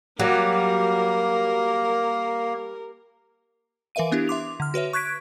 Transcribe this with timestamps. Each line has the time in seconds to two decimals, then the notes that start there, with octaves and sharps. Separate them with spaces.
0.19 F#3 G3 A#3 A#4
3.95 E3 A#4 B4 E5 F5 D#7
4.12 B3 D4 E4 G4
4.28 E5 C6 D6 F7
4.60 D3 F6
4.74 F#4 B4 C#5 E5
4.93 C#6 F#6 G#6 B6 D7